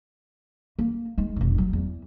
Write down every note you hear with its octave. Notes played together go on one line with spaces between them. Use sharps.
A#3
G#3 D#4
F1 B1
F#3
E2